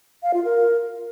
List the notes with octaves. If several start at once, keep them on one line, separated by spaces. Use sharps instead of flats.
F5
F4
A#4